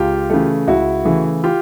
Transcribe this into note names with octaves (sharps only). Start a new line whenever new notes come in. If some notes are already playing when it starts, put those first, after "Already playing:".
Already playing: C#2 F4 G4
C#3 E3 A3
C#2 E4 F#4
C#3 E3 A3
F4 G4